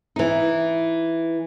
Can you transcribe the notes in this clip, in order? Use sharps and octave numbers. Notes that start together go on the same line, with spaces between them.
E3 D#4